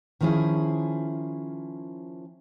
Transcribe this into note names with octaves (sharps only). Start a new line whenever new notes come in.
D#3 F3 C#4 E4 G#4